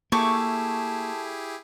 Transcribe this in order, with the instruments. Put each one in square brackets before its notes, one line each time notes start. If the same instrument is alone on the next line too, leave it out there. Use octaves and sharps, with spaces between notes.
[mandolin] A3 C#6 D6 [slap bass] A#3 [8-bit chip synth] E4 G4 G#4 [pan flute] A5